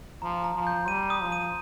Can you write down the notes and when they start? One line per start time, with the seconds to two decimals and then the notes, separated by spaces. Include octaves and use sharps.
0.22 F3 A#5
0.44 A#5
0.55 F3
0.67 G6
0.88 G3 D#7
1.10 D#6
1.21 F3
1.32 D#7